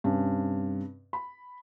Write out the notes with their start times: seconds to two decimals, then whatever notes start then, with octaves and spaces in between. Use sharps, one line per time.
0.04 G2 C3 C#4
1.13 B5